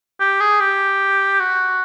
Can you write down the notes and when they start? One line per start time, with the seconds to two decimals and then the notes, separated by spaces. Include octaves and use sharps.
0.20 G4
0.40 G#4
0.60 G4
1.40 F#4